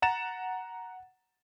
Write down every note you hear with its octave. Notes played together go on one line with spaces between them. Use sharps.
F#5 A#5 A6 E7